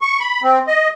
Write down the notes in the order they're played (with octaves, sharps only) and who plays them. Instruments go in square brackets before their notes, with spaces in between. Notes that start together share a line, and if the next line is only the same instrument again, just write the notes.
[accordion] C#6
B5
C4
D#5